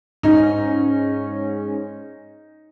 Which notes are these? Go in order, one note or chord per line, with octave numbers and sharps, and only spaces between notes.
G#2 C#4 D#4